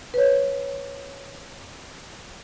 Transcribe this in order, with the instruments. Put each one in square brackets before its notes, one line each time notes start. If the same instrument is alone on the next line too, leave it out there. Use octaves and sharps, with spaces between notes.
[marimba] B4 C#5